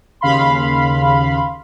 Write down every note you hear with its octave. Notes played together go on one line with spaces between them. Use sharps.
D#2 C#3 F5 B5 C6